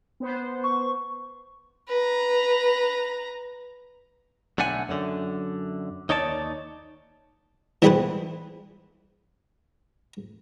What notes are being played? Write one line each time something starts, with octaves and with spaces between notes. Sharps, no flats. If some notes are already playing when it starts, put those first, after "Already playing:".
B3 C5
C#6
B4 A#5
B1 D3 A3 F#5 G#5
F#2 D3
D#2 D#4 C#5 D5 A5
E3 G3 B3 G#4 B4 C5